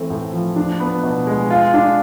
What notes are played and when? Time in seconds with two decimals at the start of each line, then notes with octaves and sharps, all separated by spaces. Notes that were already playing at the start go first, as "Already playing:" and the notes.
Already playing: E3 A3 C4
0.10 A2
0.33 F3
0.56 D4
0.80 B3
1.03 B2
1.27 G#3
1.50 F4
1.74 D4